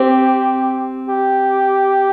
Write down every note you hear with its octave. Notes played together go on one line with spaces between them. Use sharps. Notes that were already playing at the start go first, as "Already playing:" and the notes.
Already playing: C4 G4
G4